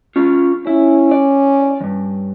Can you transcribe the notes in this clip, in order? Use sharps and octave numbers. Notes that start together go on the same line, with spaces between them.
C#4 F4
C#4 E4
D5
E2 G2